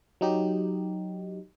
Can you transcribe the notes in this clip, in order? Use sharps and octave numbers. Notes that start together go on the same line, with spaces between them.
F#3 D#4 G4